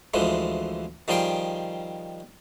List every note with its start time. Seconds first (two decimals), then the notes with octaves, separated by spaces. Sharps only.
0.14 D2 E3 F3 G#3
1.08 D#3 F3 G3 G#4 G5